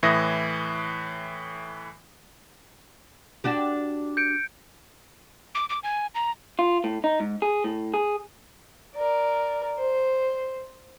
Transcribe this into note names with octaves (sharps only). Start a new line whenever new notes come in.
A2 E3 E5 D#6 A#6
D4 F#4 G4
G6 C#7 D7
D6
D6
G#5
A#5
F4
A2
D#4
G#2
G#4
A2
G#4
A#4 D5
C5